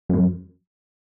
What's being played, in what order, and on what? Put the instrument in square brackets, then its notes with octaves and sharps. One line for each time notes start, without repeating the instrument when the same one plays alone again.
[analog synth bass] F#2